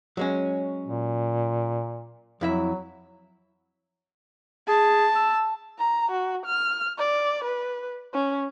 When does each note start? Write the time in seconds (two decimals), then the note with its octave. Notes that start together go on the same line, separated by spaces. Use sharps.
0.17 F#3 G#3 C#4
0.87 A#2
2.41 F2 F#3 E4 E5
4.68 G#4 A5
5.16 E6
5.79 A#5
6.11 F#4
6.46 F6
6.98 D5
7.44 B4
8.14 C#4